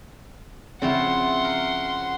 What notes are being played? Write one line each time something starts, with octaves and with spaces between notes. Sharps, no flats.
C#3 F3 C4 E4 F#5 C6
A#4